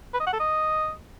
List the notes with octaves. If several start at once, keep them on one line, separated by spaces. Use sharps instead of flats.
B4
D#5
F#5
A4
D#5